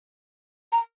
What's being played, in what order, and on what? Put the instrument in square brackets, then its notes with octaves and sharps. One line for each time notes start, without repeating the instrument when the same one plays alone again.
[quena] A#5